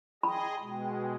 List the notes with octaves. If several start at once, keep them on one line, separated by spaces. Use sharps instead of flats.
G#4 D#5 G5 B5
B2 G#3